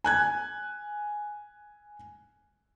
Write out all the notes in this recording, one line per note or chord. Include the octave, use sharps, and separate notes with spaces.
G#5 F#6 G#6